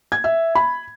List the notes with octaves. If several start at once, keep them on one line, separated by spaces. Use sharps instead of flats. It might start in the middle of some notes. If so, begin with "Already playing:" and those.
G#6
E5
B5